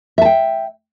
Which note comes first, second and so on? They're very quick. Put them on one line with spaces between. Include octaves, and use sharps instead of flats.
E5 A5 G5